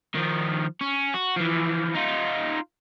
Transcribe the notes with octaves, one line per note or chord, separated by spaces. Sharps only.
D#3 F3
C#4
F#4
E3 F3
D#4 F4